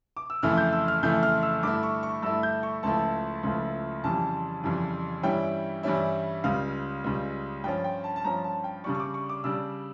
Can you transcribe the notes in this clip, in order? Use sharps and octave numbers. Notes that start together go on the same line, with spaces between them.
D6
E6
F2 C#3 E3 A3 E4 F6
G6
E6
F6
F2 C#3 E3 A3 E4 G6
F6
E6
G2 D3 A3 E4 D6
C#6
C#6
G2 D3 A3 E4 E6
G6
C#6
C#2 C#3 F3 A3 E4 A5
C#2 C#3 F3 A3 E4
F2 C#3 E3 G3 A5
F2 C#3 E3 G3
G2 E3 G3 C#4 E4 G5
G2 E3 G3 C#4 E4
C#2 C#3 G3 F5
C#2 C#3 G3
G2 F3 C#4 G5
G5
A5
A5
G2 F3 C#4 A#5
A5
G5
C#3 G3 D4 C#6
C#6
D6
C#6
D6
C#3 G3 D4 E6